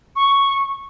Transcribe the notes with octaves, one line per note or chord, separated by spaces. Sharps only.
C#6